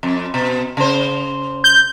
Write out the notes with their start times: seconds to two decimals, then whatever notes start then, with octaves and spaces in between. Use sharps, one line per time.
0.03 F2
0.34 B2
0.77 C#3 C5
1.64 G6